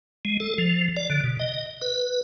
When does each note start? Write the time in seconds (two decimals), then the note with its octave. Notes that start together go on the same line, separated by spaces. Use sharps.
0.25 G#3
0.40 A4
0.58 F3
0.97 D5
1.10 D3
1.24 B2
1.39 D#5
1.81 B4